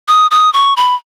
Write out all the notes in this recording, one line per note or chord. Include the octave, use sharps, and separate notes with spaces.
D#6
D#6
C#6
B5